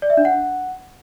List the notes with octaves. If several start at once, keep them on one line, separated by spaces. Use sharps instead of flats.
D5
E5
D4
F#5